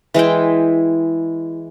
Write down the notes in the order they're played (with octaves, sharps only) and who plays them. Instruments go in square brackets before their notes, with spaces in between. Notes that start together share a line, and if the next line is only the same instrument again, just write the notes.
[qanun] E3 G#3 E4 G5